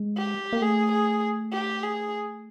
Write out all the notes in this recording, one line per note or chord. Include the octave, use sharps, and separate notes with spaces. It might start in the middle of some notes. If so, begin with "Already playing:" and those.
Already playing: G#3
G4
A#3
A3 G#4
G#4
G4
G#4